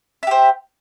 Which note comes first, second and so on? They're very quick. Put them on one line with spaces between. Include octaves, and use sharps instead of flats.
E5 G4 C5